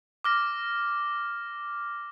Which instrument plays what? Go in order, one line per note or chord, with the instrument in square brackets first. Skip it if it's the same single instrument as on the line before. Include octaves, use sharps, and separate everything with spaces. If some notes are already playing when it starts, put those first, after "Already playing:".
[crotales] D6 F6 A#6